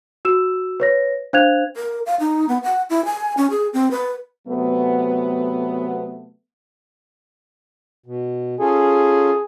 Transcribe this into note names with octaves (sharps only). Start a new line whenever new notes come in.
F#4 E6 E7
B4 C#5 A#6
D4 C5 F5 F#6 G#6 F7
A#4
F5
D#4
B3
F#5
E4
G#5
C#4
G#4
C4
B4
C3 F#3 A3 B3
B2
C#4 F4 G#4 A4